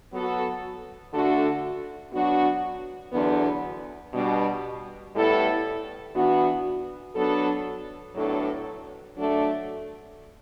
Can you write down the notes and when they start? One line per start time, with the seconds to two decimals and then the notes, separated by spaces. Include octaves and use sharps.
0.13 F#3 B3 F#4 A4
1.13 D3 A3 D4 F#4 A4
2.13 F#3 B3 D4 F#4
3.13 E2 D3 F#3 B3 D4
4.13 B2 G3 D4
5.14 A2 G3 B3 E4 A4
6.15 E3 B3 D4 F#4
7.15 F#3 B3 D4 A4
8.15 A2 F#3 B3 D4 A4
9.16 F#3 A3 D4 A4